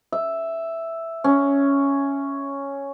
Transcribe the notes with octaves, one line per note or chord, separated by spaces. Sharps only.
E5
C#4